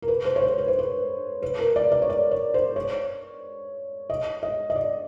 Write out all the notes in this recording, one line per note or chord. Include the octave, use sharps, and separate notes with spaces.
A#4
B4
C5
C#5
C5
B4
C5
B4
B4
A#4
D5
D5
C#5
D5
C#5
C5
C#5
D#5
D#5
D#5
D5